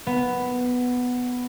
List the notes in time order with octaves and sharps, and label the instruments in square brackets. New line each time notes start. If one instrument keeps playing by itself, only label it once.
[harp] B3